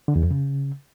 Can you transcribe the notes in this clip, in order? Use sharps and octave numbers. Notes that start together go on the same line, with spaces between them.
D3
E2
F2
C#3